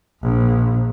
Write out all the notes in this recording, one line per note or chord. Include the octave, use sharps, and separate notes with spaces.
A#1